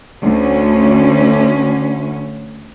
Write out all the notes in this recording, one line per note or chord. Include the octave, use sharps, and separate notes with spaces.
D2 C#4